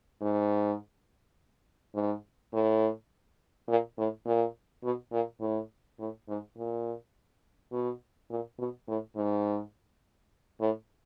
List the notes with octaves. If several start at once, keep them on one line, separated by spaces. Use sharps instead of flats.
G#2
G#2
A2
A#2
A2
A#2
B2
A#2
A2
A2
G#2
A#2
B2
A#2
B2
A2
G#2
A2